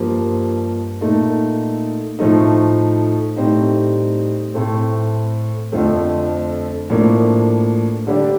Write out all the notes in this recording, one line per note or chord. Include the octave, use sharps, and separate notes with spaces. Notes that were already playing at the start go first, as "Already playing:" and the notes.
Already playing: G2 F3 A#3
A#2 A3 D#4
A2 F3 A3 D#4
A2 G3 C4 D#4
A2 A3 C4
F2 D3 F3 A3 C4
A2 F3 A#3 D4
D3 G3 D4